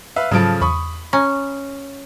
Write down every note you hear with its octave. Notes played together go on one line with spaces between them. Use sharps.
B4 E5 F5
G#2 C#3 F3 F#3 A4 D7
E2 B5 C#6 D#6
C#4 A#5